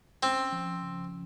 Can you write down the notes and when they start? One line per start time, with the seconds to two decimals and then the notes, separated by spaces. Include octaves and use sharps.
0.23 C4 C#4
0.52 F3
0.82 C#3